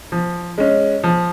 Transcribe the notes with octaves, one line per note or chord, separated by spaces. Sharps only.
F3
G#3 C#4
F3